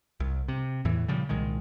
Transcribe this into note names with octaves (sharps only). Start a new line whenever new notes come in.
C2
C3
E2 A2 E3
A#2 C#3 F3 G3
C2 A#2 D#3 G#3